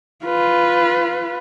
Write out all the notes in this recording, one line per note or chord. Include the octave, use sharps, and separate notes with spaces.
F4 B4